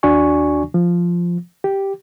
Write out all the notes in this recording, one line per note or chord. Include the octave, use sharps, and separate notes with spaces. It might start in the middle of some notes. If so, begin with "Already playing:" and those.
D#2 D4 F#4 D5 G#5 C#6
F3
G4